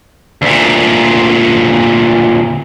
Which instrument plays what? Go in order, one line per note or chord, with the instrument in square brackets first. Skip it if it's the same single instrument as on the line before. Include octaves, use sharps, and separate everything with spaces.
[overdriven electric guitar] D2 A#2